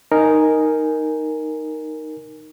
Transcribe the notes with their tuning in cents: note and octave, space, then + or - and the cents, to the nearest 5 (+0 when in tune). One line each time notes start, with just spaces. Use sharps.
D#4 +0 A#4 +0 G#5 +0